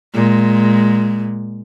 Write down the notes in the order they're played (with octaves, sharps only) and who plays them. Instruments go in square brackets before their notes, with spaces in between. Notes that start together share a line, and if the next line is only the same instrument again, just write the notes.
[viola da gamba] A#2 G#3